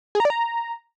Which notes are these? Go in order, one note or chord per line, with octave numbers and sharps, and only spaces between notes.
G#4
A#5
D5
A#5